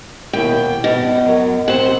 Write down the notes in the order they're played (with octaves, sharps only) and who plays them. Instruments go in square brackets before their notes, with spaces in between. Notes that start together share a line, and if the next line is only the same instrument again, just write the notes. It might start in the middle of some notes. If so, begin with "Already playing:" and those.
[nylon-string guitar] D#2 B2 E4 [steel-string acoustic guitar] G5
[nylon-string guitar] G2 [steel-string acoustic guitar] B2
[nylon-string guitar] F#2 F#3
[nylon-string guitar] E2 C4 [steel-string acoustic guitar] C5 F#5